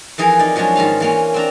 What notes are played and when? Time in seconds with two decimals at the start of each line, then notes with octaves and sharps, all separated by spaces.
0.18 F2 E3 G#4 A#4
0.39 D#4 D5
0.56 F3 F#3 G#3 C#4 D4
0.76 G#2 D#3 F4 F5
1.00 E3 A#3 C#4
1.34 C4 D4 A#5